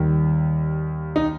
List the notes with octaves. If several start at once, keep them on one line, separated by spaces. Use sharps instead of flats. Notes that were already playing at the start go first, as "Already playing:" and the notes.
Already playing: D#2 D#3 G3
D#4